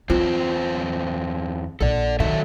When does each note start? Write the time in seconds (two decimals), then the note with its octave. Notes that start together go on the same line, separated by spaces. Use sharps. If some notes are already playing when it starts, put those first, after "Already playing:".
0.10 E2 C4 F4 C5
1.80 A#1 A4 D5
2.20 D#3 F#3 A4 E5